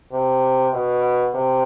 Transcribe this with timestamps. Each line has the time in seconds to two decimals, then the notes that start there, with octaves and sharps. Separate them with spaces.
0.12 C3
0.74 B2
1.34 C3